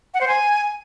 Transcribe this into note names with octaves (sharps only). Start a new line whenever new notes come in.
F#5
C5
G#5